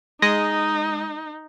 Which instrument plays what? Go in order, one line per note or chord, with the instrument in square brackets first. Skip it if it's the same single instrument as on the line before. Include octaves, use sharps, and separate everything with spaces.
[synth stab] G#3 D#5 D#6 [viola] D#4